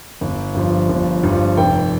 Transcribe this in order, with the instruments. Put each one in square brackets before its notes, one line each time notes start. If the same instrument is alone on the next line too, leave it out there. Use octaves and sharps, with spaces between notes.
[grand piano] G1
G2 F3
G1
G2 F3
F1 G5